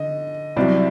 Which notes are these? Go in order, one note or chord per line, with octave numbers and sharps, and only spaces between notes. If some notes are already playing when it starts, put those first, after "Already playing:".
Already playing: D3 D#5
C2 C3 F#3 D5